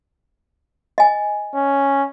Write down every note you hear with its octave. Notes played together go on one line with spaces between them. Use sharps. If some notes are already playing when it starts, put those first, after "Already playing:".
D#5 G#5
C#4